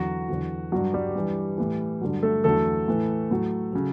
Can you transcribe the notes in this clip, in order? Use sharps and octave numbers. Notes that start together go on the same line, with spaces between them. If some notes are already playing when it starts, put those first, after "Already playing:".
Already playing: E2 D3 F#3 F#4
E2 D3 F#3
G2 F#3 F#4
G3 G4
G2 E3
A2 E3
G2 D3 F#3
A3 A4
E2 D3 F#3 A3 A4
A2 E3
A2 F#3
C#3 F#3